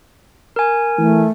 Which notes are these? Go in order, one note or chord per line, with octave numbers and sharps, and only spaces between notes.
A#4 G#5
E3 A3